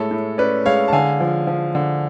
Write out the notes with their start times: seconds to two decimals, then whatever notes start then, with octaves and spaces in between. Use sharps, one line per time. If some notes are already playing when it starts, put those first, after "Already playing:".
Already playing: A2 G#3 A4 C#5
0.11 A2
0.38 C#4 B4 D5
0.66 G#3 C#5 F5
0.88 A5
0.93 D3 F5 G#5
1.20 F3
1.47 F3
1.75 D3